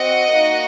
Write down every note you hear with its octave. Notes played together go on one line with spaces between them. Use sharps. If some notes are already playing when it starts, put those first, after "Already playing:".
Already playing: C4 F#4 D#5 F#5
A#3 D#4 F#4